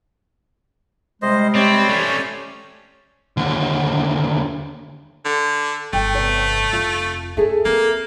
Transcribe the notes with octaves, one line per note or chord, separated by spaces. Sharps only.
C3 G3 G#3 C5 D#5
C4 G4 C#5 D5 B5
A3 C#4 C5
D#2 D3
D3
G1 A3 G5
C3 B3 C#5
F1 C4 F4
C#4 G#4 A4 E5
A#3 C4